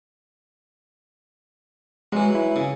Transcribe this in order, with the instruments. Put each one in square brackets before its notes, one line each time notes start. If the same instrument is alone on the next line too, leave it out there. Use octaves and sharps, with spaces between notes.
[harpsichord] E3 F#3 [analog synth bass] G#3
[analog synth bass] E4
[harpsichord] C#3